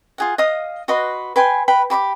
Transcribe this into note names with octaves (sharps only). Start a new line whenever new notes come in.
F4 G#4 F#5
D#5 F5 D#6
F#4 B4 D#5 C6
B4 G5 G#5 C6
B4 G5 B5
G4 B5 C#6 D6